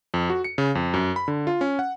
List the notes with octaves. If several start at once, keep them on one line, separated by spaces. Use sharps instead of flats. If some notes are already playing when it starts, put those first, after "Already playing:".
F2
F#4
C#7
C#3
F2
F#2
B5
D3
F4
C#4
F#5